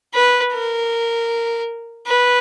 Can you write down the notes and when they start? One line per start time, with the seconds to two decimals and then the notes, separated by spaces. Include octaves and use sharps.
0.14 B4
0.53 A#4
2.07 B4